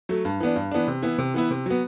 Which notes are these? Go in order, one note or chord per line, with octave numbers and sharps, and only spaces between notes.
F#3 A3
G2
E3 B3 D4
G2
E3 B3 D4
C3
E3 B3 E4
C3
E3 B3 E4
C3
F#3 B3